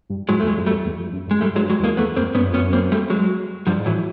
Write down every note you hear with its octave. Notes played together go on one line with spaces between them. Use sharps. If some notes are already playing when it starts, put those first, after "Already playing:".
G2
G#2 F#3 G#3
A3
E2
F#3 G#3
F2
G3 A3
F2
E2
F2
F#2
G2
G#3
G#2 G3 A3
G#2
F#3 G#3
G2
F#3 G#3
E2
G#3 A#3
E2 A3 B3
F2 A#3 C4
G2 B3 C#4
F#2
F2
F#2 B3 C#4
A#3 C4
G3 A3
F#3 G#3
G2 F3 G3
G#2
A2 E3 F#3